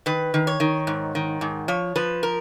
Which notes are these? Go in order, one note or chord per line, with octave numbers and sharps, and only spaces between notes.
D#3 B4
D#3
C#5
D#3
G#2
D#3
G#2
F3 C#5
F3 B4
A#4